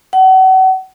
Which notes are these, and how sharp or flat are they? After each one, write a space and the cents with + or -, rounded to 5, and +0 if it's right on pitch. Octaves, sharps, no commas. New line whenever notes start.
F#5 +35